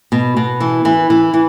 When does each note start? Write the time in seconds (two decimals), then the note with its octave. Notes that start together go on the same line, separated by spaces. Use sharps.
0.12 B2
0.37 B2
0.60 E3
0.85 E3
1.10 E3
1.34 E3